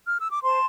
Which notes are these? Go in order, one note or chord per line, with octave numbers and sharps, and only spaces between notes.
F6
E6
D6
C5 A5 C6